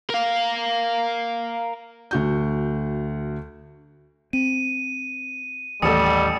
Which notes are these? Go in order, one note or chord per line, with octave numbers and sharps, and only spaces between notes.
A#4 F5
D2 F#4 G6
C4 D#7
A1 D#2 G3 A4 D#6 C#7 E7